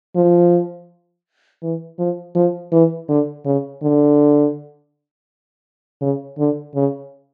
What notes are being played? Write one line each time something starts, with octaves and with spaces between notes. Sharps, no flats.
F3
E3
F3
F3
E3
D3
C#3
D3
C#3
D3
C#3